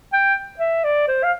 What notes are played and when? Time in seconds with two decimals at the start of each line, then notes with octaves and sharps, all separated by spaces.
0.13 G5
0.59 E5
0.84 D5
1.08 C5
1.24 F5